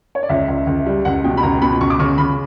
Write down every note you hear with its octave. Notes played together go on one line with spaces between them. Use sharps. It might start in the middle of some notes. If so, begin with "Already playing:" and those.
C#5
D5
C#2 E5
C#2
C#2
G3
C#2 F#5
B2 G5
B5
C#2 A#5
B2 B5
C#2 C#6
D6
C#3 C#6
C#3 B5